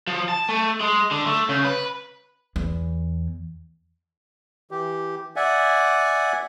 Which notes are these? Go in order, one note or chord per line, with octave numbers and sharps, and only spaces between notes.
F3
A5
A3
G#3
D3
A3
C#3
B4
E2
E3 G4
D5 E5 F#5 G#5